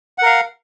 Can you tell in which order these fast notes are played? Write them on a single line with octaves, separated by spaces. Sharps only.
F#5 A#4 F5